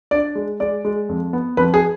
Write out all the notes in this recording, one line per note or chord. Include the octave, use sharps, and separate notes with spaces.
D4 D5
G#3
G#3 D5
G#3
F2
B3
F2 B4
G#4